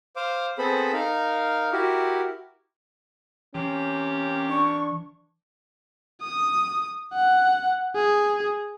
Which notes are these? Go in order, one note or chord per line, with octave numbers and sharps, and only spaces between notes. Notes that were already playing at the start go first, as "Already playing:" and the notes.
C5 F5 D6
B3 C4 G#4 A4 C5 B5
D#4 A#4 F5
E4 F#4 G4 A#4
C3 E3 A#3 C#4 G4
D4 C#6
D#6
F#5
G#4